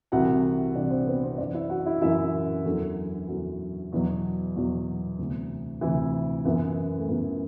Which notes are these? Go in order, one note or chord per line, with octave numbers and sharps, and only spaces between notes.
C2 C3 E3 F#4 F#5
C2 C3 E3 D4 D5
C4 C5
B3 B4
C4 C5
F#2 E3 D4 D5
E4 E5
F#4 F#5
E4 E5
F#2 E3 E4 E5
E2 D3 F#3
E2 D3 F#3 F#4
E2 B2 F#3
E2 B2 F#3
D2 C3 E3
D2 C3 E3 E4
F#2 E3 B3
A3
F#2 E3 B3